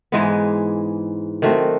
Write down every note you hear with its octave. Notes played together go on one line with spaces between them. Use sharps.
G#2 E3 G#3 B3
D#3 F#3 A3 C4